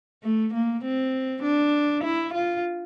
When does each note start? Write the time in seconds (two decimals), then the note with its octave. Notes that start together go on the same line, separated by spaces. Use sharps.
0.23 A3
0.54 A#3
0.84 C4
1.43 D4
2.04 E4
2.34 F4